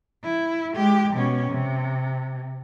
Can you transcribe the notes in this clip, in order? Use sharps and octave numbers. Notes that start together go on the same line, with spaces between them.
E4
G#3 G4
B2 C#4
C3